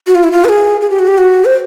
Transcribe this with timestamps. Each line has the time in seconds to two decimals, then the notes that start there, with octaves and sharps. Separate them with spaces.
0.07 F#4
0.15 F4
0.24 E4
0.32 F4
0.45 B4
0.49 G#4
0.81 G#4
0.90 G4
0.99 F#4
1.08 G4
1.18 F#4
1.45 C5